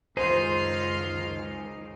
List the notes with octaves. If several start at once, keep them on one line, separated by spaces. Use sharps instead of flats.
C#2 F#2 D#3 D#4 F4 G#4 C5 F5